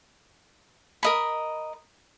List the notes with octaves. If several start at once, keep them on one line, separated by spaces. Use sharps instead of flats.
A#4 D#5 B5